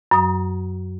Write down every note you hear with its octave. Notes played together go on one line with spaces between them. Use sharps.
F#2 F#3 A#5 D#6